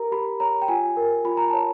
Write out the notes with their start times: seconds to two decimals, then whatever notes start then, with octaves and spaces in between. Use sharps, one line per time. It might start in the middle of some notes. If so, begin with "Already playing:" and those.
Already playing: G4 A#4 A#5
0.12 G4 B5
0.40 C#5 A#5
0.62 G5
0.68 F4 G#5
0.97 A#4
1.24 F4 B5
1.37 A#5
1.50 C#5 A5